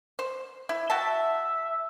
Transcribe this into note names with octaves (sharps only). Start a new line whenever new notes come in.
C5
E4
F#4 E5 G5 A5